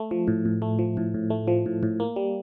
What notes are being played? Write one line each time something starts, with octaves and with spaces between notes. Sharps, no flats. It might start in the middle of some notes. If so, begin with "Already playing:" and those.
Already playing: A3
F3
A2
A2
A3
F3
A2
A2
A3
F3
A2
A2
A#3
G3